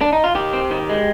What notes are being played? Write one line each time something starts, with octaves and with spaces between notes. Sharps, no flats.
D4
D#4
F4
D#3 G4
C4
D#3
G#3